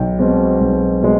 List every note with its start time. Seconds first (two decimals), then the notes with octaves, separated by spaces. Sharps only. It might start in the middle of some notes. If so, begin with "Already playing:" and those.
Already playing: B1 G5
0.19 B2 G#3 C4
0.60 B1
1.03 B2 G#3